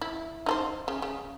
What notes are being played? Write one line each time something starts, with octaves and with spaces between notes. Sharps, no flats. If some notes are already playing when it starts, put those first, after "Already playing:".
E4
D#4 A4 C5
C#3
C#3